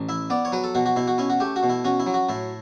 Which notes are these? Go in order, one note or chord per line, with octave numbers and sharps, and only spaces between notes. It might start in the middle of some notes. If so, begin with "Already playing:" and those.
Already playing: A1
E4 E5
B3 D5
C#5
F#3 B4
A4
B2 F#4
F#4
B2 E4
F#4
C#4 E4
F#4
A3 G4
F#4
B2
E4
C#4 F#4
E4
F#3
F#4
A2 E4